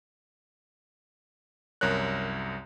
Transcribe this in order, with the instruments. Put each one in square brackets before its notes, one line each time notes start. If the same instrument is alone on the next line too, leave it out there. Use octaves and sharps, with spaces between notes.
[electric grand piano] C2 F#2 A#4 C#5 F#6